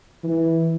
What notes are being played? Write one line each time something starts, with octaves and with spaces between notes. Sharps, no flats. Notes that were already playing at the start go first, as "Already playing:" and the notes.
E3